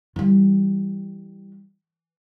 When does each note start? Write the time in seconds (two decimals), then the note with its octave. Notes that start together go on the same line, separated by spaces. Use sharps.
0.16 E3 G3